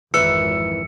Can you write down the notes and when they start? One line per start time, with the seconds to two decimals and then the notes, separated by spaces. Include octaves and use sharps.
0.14 G#1 F2 D#3 E3 B4 E6 C#7